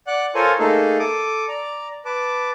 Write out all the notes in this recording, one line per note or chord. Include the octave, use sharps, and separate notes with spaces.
D5 F#5 F#6
F4 A4 A#4 C5 C#5 G#5
A3 A#3 D#4 G#4 A4
A4 D6 D#6
D5 A#5
B4 A5 D6